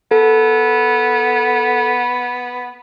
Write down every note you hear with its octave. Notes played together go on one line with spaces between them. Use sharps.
B3 A4